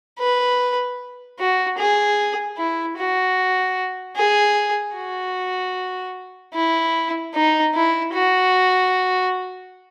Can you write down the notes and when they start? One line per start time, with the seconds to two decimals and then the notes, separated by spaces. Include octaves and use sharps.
0.19 B4
1.39 F#4
1.78 G#4
2.57 E4
2.97 F#4
4.16 G#4
4.95 F#4
6.54 E4
7.34 D#4
7.74 E4
8.14 F#4